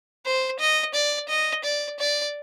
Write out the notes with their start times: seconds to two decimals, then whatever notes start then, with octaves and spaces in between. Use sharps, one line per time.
0.26 C5
0.59 D#5
0.94 D5
1.29 D#5
1.64 D5
1.99 D5